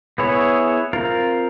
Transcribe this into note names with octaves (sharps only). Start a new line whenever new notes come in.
B3 E4 G#4 C#5
C4 F4 A#4